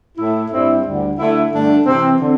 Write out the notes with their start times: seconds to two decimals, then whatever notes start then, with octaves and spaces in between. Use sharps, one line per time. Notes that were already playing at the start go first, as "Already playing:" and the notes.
0.18 A2 A3 E4
0.51 G2 G3 C4 E4
0.84 D2 D3 G3
1.18 D3 A3 E4
1.51 G2 D3 A3 D4
1.85 C3 E3 C4
2.19 D3 C4